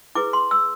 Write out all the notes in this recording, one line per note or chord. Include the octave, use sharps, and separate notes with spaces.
E4 G#4 B4 D6
C6
E6